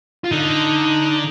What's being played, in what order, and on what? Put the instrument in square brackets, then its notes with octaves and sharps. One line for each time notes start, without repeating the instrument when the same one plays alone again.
[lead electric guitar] F4
[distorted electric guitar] D3 [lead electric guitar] D#4